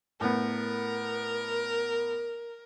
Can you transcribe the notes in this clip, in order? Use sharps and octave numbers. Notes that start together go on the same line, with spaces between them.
A2 B3 A#4